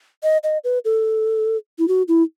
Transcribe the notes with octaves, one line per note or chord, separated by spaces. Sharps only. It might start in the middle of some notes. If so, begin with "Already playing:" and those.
D#5
D#5
B4
A4
E4
F#4
E4